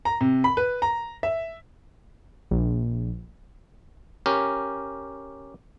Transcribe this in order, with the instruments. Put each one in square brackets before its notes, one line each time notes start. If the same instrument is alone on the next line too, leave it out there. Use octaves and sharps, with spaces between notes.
[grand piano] A#5
C3
B5
B4
A#5
E5
[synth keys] A#1
[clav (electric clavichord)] C#4 G4 A#4